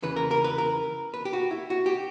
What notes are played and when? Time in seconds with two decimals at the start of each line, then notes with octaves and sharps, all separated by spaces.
0.03 E2 C#3 E3 B4
0.16 A#4
0.31 A#4
0.44 B4
0.58 A#4
1.14 B4
1.25 G4
1.33 F#4
1.51 E4
1.70 F#4
1.86 G4